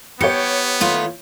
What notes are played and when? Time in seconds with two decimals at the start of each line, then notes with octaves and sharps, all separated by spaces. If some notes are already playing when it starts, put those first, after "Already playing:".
0.21 B3 G4 C#5 G6 C#7
0.81 D#3 A3 F4